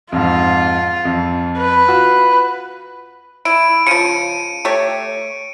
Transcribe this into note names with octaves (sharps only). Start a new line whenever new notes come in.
F2 G#2 F4
F2
B4
F4 F#4
E4 D7
C#3 F3 C#7 D#7
A3 G4 C#5